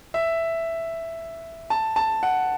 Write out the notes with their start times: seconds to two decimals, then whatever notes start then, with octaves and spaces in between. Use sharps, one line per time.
0.14 E5
1.70 A5
1.96 A5
2.23 F#5